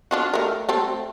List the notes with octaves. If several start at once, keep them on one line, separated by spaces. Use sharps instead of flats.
D4 F4 F#4
A3 A#4
A3 C4 A4